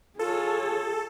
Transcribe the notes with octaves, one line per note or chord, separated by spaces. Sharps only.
F4 G#4 A4 C#5